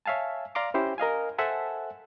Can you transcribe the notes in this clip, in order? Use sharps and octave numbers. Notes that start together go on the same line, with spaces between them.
C#5 E5 F5 G#5 A5
D5 F5 A#5 C6 D6
C#4 E4 G4 C5
A#4 D#5 F5 G#5
A4 C5 E5 F#5 G#5 A5